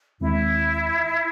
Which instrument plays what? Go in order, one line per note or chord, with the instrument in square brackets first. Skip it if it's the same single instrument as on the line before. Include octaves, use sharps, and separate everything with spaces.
[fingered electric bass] D#2 D#3 G#3 C4 [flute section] E4